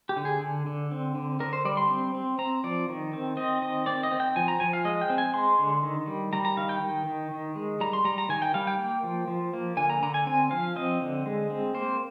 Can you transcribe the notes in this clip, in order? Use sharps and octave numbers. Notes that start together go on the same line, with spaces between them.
G4
D3
G#4
D3
D3
C4
D3
D3 A#4
C5
G3 D5
C6
C4
C4
C4 A#5
F3 D5
D#3
C4
C4 D#5
D#3 D#5
C4 D5
D#5
C4
G5
F3 G#5
A#5
F3 G#5
F5
G#3 D#5
G5
C4
G#5
G#3 C6
D3
D#3
G3
G3 A#5
A#5
D#3 F5
G5
D#3
D#3
D#3
G#3
G3 A#5
C6
G3 A#5
A#5
D#3 G#5
G5
G3 F5
G5
A#3
F3
F3
A#3
D3 G#5
A#5
D3 A#5
G#5
C4 G#5
F3 F5
C4 D#5
D3
G#3
C4
A#3 C5